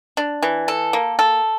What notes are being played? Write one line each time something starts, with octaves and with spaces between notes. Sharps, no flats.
D4
E3
A4
A#3
A4